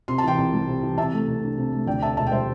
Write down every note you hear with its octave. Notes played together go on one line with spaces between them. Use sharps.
C3 C6
A5
E3 G5 C6
C2
G3
C3
E3
C3 E5 A5
A3
C2
D4
C3
A3
D2 D5 G5
C3 E5 A5
E1 E5 A5
G5
G3 C5 E5